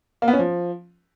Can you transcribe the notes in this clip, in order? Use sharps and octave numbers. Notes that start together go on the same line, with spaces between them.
A#3
B3
C#4
F3